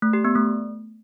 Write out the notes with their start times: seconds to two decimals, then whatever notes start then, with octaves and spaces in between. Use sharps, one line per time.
0.02 A3
0.13 G4
0.25 B3
0.36 A3